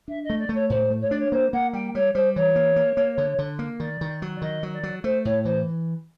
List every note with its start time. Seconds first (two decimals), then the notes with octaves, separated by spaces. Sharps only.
0.08 D4 E5
0.24 D#5
0.30 A3
0.39 D5
0.49 A3
0.55 C#5
0.70 A2 C5
0.90 A3
1.01 C#5
1.10 D4 D5
1.19 C#5
1.32 A#3 C5
1.53 A#3 F#5
1.73 G3 G5
1.95 G3 C#5
2.14 G3 C5
2.36 E3 C#5
2.56 A#3
2.76 A#3
2.97 A#3
3.18 D3
3.39 D3
3.59 A#3
3.80 D#3 D5
4.01 D#3
4.22 F#3
4.36 D5
4.42 D#3 D#5
4.63 F#3
4.73 D5
4.83 F#3
5.04 A3 C5
5.25 A2 C#5
5.45 E3 C5